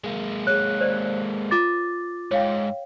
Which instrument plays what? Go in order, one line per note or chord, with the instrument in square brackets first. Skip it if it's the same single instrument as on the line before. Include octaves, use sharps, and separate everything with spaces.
[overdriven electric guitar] G#3 A#3
[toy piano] G#4 C#5 [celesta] F#6
[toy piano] C5 D5
[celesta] F4 D6 A6
[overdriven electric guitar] G#2 [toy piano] C#5 F5 G5